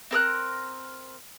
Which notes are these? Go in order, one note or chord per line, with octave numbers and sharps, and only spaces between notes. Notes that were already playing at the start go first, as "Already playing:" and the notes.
C4 A#4 D#6 F#6